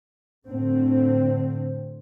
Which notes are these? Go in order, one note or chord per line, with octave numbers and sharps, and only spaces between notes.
A2 D3 C4